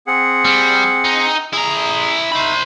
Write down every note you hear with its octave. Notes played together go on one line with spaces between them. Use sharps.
C4 G#4 F#5
G3
D#4
E4 G#4 A#5
D#4 C5 E5 B5